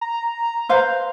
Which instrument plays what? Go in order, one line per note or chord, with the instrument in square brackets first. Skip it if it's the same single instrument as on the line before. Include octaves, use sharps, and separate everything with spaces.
[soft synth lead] A#5
[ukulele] B4 C5 F5